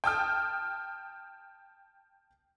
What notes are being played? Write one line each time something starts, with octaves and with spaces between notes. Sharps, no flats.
G5 A5 D#6 F6